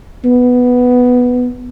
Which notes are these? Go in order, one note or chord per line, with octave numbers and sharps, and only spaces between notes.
B3